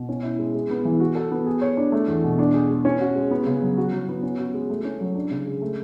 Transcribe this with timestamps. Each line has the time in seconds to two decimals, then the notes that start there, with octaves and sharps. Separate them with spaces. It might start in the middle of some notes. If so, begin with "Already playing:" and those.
Already playing: B2
0.09 C#4
0.23 E4
0.39 G#3
0.54 G#3
0.70 B3
0.85 E3
1.00 F#4
1.15 A4
1.31 B3
1.46 G#4
1.61 C#5
1.77 D4
1.92 A3
2.08 E2
2.24 B2
2.39 D4
2.54 G#4
2.70 G#3
2.85 C#4
3.00 F#4
3.15 G#3
3.31 B3
3.46 C#3
3.62 F#3
3.77 F#4
3.93 F#3
4.08 B3
4.23 C#4
4.39 F#4
4.54 G#3
4.70 A3
4.85 C#4
5.01 F#3
5.15 D4
5.31 C#3
5.47 G#3
5.61 A3